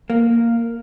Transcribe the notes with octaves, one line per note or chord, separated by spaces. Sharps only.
A#3